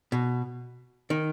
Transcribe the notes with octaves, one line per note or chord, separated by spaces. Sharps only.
B2
D#3